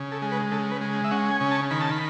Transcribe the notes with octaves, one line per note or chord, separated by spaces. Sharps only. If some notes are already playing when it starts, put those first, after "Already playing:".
Already playing: C#3
A4
G#3
B4
C#3 A4
B4
G#3
E5
C#4 F#5
G#5
C#3
A5
D#3 B5
A5
B5